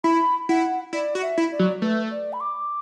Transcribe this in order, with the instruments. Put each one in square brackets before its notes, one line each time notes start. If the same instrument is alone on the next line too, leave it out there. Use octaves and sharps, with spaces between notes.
[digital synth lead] E4 [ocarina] B5
[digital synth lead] E4 [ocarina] F#5
[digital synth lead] E4 [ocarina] D5
[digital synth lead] F#4
[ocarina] E5
[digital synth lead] E4
[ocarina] D5
[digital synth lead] F#3
[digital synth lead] A3 [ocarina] B4
[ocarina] D5
B5
D6